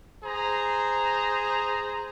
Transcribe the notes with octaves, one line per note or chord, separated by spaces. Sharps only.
G#4 C5 A#5